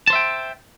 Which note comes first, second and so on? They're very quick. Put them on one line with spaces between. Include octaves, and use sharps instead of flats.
A5 C5 E5 G5